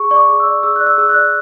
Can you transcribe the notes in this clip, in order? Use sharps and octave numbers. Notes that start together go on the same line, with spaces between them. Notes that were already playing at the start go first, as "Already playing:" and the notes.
Already playing: G#4 C#6
D5 C#6
D6
G#4
E6
D5
G#4 E6
D5 F#6
E6
G#4 E6
F#6
D5